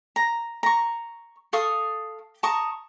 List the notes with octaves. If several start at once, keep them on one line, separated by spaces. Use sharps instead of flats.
A#5
A#5 C#6
A4 F5 C#6 D#6
A5 A#5 C#6 D#6